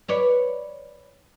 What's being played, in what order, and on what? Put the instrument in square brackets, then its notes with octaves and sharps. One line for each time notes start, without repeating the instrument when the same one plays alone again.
[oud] B4 C#5 D5